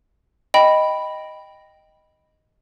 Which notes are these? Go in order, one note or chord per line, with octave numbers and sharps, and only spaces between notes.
D#5 G5 B5